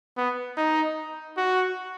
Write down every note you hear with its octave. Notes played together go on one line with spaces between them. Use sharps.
B3
D#4
F#4